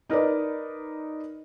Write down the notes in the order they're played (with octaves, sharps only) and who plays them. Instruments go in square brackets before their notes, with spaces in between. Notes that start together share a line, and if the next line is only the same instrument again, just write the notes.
[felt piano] D#4 A#4 B4 D5